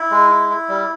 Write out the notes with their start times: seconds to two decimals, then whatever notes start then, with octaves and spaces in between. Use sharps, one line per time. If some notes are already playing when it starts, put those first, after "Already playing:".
Already playing: E4
0.11 G#3
0.30 E4
0.50 E4
0.68 G3